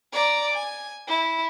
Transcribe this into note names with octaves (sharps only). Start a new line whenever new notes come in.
D5 A#5
G#5
E4